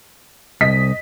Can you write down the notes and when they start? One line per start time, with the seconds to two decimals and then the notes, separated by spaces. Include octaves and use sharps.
0.61 C2 D#5 B6